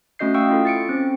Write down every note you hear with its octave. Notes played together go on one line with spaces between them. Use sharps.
A3 C#4 F#4 D#5 G6 C7
F5 G5 C#6 D#6 E6
E4 F4 A4
A6 C#7 D7
C4 C#4